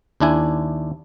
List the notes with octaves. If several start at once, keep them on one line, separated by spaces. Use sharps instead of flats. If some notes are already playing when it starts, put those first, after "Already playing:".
D#2 D4 E4 G#5